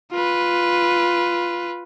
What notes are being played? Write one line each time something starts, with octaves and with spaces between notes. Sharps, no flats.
F4 B4